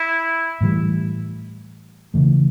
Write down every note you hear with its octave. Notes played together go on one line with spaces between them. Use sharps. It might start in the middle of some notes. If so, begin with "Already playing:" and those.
Already playing: E4
A2 E3 G3
C#3 E3 A3